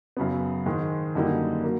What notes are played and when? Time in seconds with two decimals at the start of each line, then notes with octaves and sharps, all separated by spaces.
0.17 F#2 C#3 F#3 B3
0.66 G#2 D#3 G#3
1.15 F#2 D3 G3 A#3 D#4
1.64 F#3 A#3